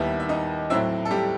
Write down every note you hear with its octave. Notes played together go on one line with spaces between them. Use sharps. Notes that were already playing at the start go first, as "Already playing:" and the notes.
Already playing: D#2 D#3 G3 B3 E4 E5
E5
D#4 D#5
A2 F#3 C4 E4 E5
A4
G3 G4